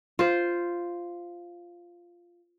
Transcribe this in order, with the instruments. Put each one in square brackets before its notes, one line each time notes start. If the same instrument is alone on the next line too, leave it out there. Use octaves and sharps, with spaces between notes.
[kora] F4 C5